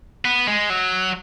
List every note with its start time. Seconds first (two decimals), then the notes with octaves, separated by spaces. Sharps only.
0.25 B3
0.47 G#3
0.70 F#3